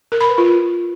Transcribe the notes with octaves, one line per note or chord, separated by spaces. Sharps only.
A#4
B5
B4
F4